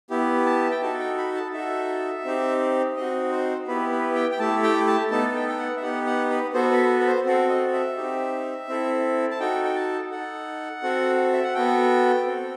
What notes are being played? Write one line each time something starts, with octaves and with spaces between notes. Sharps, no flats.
B3 E4 G4
A5
G5
D#4 F#4 A4 A5
G5
B5
A5
D#4 F#4 A4 E5
C4 D#4 G4
C4 D#4 F#4 D#5
C5
B3 E4 G4 B4
B4
G5
G5
A3 E4 G4 A5
G5
A5
B3 D#4 A4 A5
A5
G5
G5
F#5
E5
B3 D#4 G4 F#5
F#5
B4
B3 F#4 A4 C5
B4
B4
C5
C4 F#4 A4
D#5
E5
C4 D#4 G4
C4 E4 A4
A5
D#4 F#4 A4 G5
G5
A5
D#4 A4 F#5
C4 F#4 A4
E5
F#5
B3 F#4 A4 G5
C4 F#4 A4